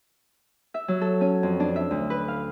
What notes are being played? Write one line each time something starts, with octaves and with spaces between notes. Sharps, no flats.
E5
F#3
A4
C#4
F2
D4
E5
D2
B4
F5